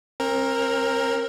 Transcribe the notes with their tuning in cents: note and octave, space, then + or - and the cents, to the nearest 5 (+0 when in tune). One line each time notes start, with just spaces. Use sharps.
C4 +40 A#4 +0